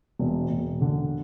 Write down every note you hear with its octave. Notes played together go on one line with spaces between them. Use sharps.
E1
E1
D3